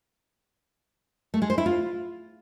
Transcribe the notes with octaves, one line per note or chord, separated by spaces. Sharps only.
A3
G#3
C5
E4
F4